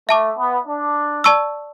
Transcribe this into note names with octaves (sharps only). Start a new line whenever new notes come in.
A3 E5 A5 D6
B3
D4
D5 A5 C#6 E6